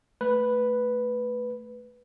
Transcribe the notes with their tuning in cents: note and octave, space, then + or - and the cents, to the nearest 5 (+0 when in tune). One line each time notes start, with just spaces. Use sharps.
A3 +0 B4 +0